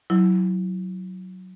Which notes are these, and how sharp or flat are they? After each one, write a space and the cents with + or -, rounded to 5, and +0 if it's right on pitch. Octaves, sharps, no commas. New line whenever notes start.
F#3 +0 E4 +0